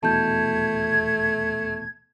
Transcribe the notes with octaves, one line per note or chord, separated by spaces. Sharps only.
D#1 E2 B2 A3 A5 G6 G#6